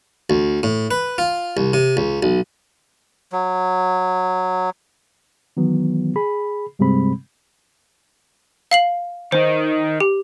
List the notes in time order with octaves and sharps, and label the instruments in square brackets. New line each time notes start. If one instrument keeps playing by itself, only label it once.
[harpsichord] D2
A2
B4
F4
C2
C3
C#2
B1
[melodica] F#3
[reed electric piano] D#3 E3 F#3 B3
G#4 B5
G2 C3 G3 G#3 C4 B5
[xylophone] F5 C7 F#7
[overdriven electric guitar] D#3 D#4 [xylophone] C5
[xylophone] G4